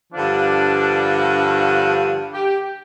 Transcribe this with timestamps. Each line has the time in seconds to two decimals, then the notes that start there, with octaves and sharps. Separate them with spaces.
0.12 G2 D3 F3 D4
1.38 F#4
2.33 G4